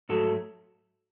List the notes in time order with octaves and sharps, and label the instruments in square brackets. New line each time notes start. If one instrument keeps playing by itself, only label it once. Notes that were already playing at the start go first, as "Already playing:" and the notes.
[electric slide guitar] G#2 F#3 A3 F#4 A4